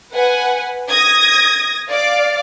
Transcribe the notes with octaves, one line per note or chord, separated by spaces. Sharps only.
B4 F#5 G#5
D#6 G#6 A#6
D5 F5 D6